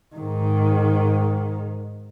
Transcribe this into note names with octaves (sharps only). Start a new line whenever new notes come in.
G#2 D#3